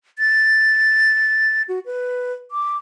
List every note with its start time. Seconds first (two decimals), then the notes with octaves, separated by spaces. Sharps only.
0.19 A6
1.68 F#4
1.86 B4
2.51 D6